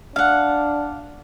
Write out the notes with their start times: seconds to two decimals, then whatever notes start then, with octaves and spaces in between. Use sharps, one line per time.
0.16 D4 F5 F#5